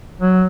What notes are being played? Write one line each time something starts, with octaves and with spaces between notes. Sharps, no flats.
F#3